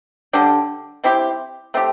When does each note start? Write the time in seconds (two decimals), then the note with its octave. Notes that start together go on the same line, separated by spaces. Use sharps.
0.33 D3 G3 D4
1.04 G3 C4 E4 G4
1.74 A3 C4 G4